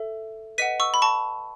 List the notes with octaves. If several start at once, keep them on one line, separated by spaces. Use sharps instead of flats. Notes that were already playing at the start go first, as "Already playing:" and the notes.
Already playing: A4 E5
B4 D#5 F#5 B6 D#7
C#6 E6
B5
A5 C#6